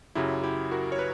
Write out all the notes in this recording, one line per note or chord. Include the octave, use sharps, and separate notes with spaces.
F#2 C#3 F#3 E4 G4
E4 G4
F#4 A#4
C#5
B4